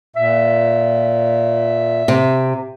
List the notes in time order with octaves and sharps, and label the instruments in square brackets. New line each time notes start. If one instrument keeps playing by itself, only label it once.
[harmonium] A#2 [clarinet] E5
[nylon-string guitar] C3